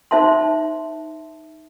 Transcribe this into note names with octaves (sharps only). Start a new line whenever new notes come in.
D#4 C5 E5 A5 C6